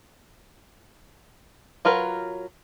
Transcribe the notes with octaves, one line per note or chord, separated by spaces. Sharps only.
F#3 F4 A#4 B4